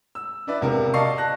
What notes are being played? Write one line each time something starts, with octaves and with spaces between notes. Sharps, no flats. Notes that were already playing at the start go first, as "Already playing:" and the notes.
E6
D4 E4 B4 D5
E1 C3 A#4
D5 D#5 F5 A5 C#6 C7
A5 F#6 A#6